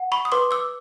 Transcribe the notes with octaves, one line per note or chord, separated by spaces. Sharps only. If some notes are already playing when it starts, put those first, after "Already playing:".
Already playing: F#5
B5 C#6
D#6
B4 C6 D6
D6 E6